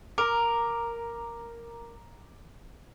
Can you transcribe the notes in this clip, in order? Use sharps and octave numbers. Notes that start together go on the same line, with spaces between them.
A#4 A#5 D6